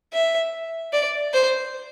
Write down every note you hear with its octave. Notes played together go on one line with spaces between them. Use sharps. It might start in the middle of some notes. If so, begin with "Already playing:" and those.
E5
D5
C5